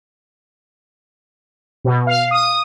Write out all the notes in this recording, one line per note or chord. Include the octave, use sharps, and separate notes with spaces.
B2
F5
D#6